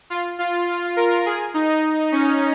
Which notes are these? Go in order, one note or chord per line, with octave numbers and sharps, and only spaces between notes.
F4
F4
F4
A#4
G#4
D#4
C#4